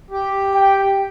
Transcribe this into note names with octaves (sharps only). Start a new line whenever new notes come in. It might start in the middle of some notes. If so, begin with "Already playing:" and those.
G4
G5